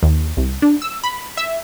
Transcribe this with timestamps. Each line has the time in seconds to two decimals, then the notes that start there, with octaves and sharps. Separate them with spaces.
0.03 D#2
0.37 C2
0.62 D4
0.82 E6
1.04 B5
1.37 E5